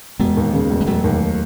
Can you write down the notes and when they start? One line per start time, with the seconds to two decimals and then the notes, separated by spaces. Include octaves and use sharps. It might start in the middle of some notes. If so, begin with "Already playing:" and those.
0.19 E1 G#3 B3
0.37 D#2
0.53 C#3
0.70 E1
0.81 G#3
0.87 E1 F#3 A3
1.04 D#2